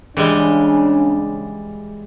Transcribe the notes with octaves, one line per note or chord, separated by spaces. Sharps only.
C#3 E3 G3 G#3 D4